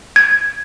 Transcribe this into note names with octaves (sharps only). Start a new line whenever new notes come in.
G#6